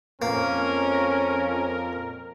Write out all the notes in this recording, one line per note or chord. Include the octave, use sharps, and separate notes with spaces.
F2 A#3 C#4 A#4